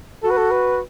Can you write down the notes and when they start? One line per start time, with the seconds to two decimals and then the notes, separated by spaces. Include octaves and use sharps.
0.23 F#4 A4
0.31 B4
0.37 A4
0.51 B4